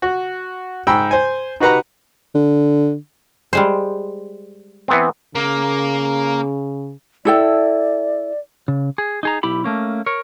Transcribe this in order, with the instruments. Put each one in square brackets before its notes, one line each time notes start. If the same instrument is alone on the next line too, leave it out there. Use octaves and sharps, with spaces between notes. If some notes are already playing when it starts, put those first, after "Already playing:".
[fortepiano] F#4
G#2 G5 B5 E6
C5 G#5
D#4 F#4 G4 B4 F#5 A#5
[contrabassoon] D3
[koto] G3 G#3 C5
[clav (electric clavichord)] E3 B3 C4
[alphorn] C#3 [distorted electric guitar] A#3
[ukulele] E4 A4 G5 [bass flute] D5
[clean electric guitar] C#3
G#4
D#4 G#4 A#5
B1 E4 G4 B5
A3 A#3 C#4
A#4 C#5